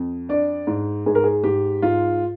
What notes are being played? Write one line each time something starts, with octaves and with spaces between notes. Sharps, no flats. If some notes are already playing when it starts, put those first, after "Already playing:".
Already playing: F2
D4 D5
G#2
G#2 G#4
A#4
G#4
G#2 G4
G#2 F4